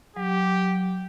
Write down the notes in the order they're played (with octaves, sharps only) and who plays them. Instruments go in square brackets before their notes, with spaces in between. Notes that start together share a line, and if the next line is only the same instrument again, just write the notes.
[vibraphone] F#3 [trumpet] G4